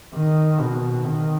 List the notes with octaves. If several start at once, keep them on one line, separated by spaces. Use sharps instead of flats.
D#3
B2
D#3